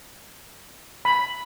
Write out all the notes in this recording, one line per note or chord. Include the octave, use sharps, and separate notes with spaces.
B5